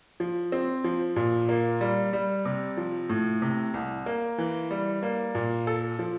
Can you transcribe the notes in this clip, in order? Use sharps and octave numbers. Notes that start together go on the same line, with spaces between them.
F3
C4
F3
A#2
A#3
G3
G3
C3
F3
A2
C3
C2
A#3
E3
G3
A#3
A#2
A4
F3